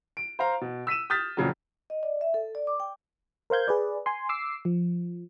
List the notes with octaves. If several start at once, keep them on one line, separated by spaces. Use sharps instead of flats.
D7
C5 F5 A#5
B2
E6 B6 D#7 E7
D#6 F6 G6 A6 B6
F2 A#2 C#3 F#3
D#5
D5
E5
A4
D5
D6
G5
A#4 C5 F5 G6 G#6
G#4 B4 D5
G#5 C6
D6 E6 C7
F3